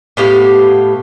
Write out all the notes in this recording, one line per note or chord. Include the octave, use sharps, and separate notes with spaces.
A2 B3 G4 F5